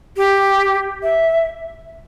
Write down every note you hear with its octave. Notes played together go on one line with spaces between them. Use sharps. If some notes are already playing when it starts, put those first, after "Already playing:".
G4
E5